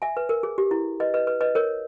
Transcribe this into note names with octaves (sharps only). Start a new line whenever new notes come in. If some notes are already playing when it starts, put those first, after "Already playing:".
E5 G#5
B4
A#4
G#4
G4
E4
B4 D#5
B4 D#5
B4
B4 D#5
A#4 C#5